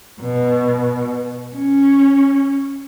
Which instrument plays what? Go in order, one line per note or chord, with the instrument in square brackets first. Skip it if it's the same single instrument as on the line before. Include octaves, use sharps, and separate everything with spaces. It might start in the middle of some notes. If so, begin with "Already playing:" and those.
[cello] B2
C#4